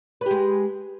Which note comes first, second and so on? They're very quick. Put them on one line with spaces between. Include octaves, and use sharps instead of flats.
B4 G4 G#3